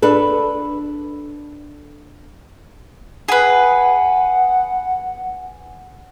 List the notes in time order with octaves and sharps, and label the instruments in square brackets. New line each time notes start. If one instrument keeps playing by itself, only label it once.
[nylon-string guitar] D4 A4 B4
[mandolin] G#4 B4 [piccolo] F#5